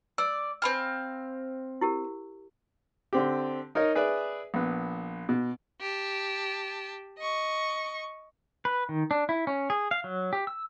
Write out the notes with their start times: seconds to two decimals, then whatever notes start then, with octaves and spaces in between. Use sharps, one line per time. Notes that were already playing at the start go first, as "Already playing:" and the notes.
0.18 D5 E6
0.62 C4 F5 G#5 B5 F6
1.81 E4 G4 A#4
3.13 D3 C4 G4
3.75 D#4 A#4 C#5 D#5
3.95 G#4 B4 D5 E5
4.54 A#1 B3
5.29 B2
5.81 G4 A5
7.18 D#5 C#6
8.65 B4
8.89 D#3
9.11 D4
9.29 E4
9.47 C#4
9.70 G#4
9.91 F5
10.04 F#3
10.33 G4
10.47 E6